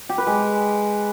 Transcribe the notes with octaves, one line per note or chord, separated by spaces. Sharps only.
G4
B4
G#3